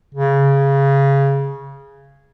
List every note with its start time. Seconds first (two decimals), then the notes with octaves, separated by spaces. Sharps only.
0.15 C#3